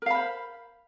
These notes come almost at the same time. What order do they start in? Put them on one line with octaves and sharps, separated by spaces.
A#4 F5 B5 C5